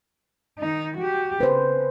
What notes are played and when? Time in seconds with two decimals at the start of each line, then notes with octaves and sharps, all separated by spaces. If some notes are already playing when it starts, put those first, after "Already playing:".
0.59 D#3 D#4
0.97 F#4 G4
1.40 C#3 B4 C5